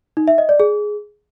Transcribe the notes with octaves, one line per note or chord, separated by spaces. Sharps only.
D#4
E5
D#5
D5
G#4